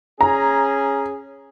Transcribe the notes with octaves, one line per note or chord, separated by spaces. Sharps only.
C#4 G#4 A#5